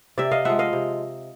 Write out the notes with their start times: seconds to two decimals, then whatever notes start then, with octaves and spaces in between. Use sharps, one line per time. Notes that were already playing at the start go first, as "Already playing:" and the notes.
0.18 C3 D5 E5
0.31 D#5 F5
0.45 F3 G#3 E5 F#5
0.59 D#5 F5
0.73 C3